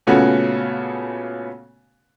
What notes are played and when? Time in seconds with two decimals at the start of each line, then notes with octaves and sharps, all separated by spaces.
0.07 A#2 C#3 A3 B3 C#4 F#4